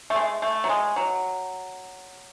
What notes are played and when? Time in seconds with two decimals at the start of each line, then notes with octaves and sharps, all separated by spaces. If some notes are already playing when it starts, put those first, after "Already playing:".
0.10 A3
0.16 G#3
0.42 A3
0.64 F#3
0.69 G#3
0.96 F#3